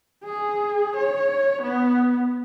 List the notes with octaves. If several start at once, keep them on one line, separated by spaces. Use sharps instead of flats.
G#4
C#5
B3